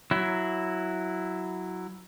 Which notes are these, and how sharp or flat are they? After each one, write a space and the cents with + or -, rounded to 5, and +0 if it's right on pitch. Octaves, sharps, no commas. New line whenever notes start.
F#3 +0 E4 +0